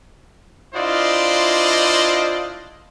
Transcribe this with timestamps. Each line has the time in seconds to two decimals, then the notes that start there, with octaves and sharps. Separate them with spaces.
0.74 D4 E4 F4 C5 D5 D#5